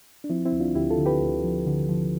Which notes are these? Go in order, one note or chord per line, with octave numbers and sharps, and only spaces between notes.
D4
F3 C4 E4
C4 E4
D2
D4 F4
D2 E4 G4
F4 A4
D3
G4 B4
D2
F3
D3
F3